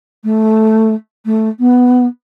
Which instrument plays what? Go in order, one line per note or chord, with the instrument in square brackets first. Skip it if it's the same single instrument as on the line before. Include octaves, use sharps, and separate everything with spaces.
[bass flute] A3
A3
B3